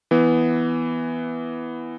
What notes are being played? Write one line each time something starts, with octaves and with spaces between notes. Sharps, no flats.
E3 B3